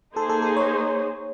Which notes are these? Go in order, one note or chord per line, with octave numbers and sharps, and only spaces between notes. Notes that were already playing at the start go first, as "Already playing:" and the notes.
A#3 D#4 G#4 A4 C5
A4
A4
C#5